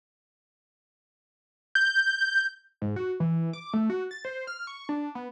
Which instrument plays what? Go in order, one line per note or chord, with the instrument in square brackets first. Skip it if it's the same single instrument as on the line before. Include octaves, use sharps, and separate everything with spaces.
[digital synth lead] G6
G#2
F#4
E3
D6
A3
F#4
A6
C5
F6
C#6
D4
B3